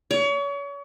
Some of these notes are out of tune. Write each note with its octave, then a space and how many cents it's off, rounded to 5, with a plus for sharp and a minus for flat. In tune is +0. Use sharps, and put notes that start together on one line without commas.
C#5 +35